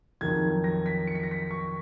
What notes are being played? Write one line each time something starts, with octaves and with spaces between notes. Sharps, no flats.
F2 D#3 F#3 G#6
A#6
B6
C#7
B6
A#6
B6
C#6